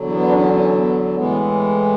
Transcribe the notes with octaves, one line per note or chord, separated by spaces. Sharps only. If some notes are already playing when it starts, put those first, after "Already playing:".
Already playing: E2 D3 F#3
B3
D4
C#4
C#4
B3
A2 E3 G#3 B3